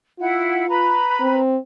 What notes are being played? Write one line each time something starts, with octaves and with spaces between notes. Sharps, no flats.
E4 F4 F#5
B4 A#5 B5
C4